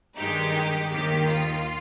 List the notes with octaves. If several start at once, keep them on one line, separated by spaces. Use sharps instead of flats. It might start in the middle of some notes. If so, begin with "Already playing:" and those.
G2 D#3 G#3 D#4 G4
D#2 D#3 A#3 G4
F4